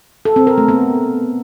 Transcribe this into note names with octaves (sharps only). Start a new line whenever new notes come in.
A4
C4
A#4
A3
B3